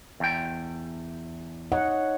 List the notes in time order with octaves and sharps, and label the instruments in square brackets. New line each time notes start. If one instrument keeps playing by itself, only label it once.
[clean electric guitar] E2 G5
[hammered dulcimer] D#4 C#5 [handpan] F#5